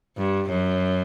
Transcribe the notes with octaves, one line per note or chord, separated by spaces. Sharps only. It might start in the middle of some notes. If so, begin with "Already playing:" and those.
G2
F#2